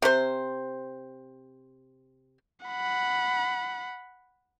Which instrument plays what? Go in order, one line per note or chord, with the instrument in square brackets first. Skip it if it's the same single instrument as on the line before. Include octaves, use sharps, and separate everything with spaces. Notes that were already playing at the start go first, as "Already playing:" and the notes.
[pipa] C3 C5
[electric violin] F#5 B5